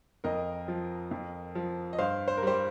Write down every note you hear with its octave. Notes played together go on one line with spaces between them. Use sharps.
F2 A#4 D#5
F3
F2
F3
D#5
G2 C5 F5
C5
A#4
G3 G4 C5